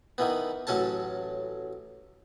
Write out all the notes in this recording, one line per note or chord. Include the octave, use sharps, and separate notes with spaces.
D#3 E3 B3
A1 F#3 C#4 A4 A5